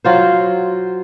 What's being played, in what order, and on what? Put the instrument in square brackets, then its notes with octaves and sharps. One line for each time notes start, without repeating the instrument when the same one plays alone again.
[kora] F#3 F4 C5